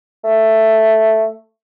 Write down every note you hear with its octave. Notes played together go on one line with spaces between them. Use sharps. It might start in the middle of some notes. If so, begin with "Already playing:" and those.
A3